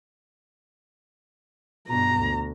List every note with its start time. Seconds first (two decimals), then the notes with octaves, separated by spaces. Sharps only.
1.89 G2 B2 A#5
2.18 D2